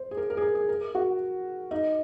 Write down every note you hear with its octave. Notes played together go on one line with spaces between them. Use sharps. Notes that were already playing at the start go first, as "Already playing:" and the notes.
Already playing: C5
G#4
A#4
A#4
G#4
A#4
G#4
A#4
F#4
D#4